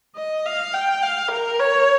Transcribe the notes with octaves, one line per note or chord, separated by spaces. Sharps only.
D#5
F5
G5
F5
A#4
C#5